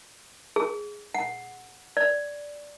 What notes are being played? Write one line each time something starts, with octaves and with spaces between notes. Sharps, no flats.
G#4
F#5
D5